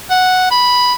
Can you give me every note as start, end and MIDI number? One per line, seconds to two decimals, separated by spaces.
0.10 0.49 78
0.51 0.94 83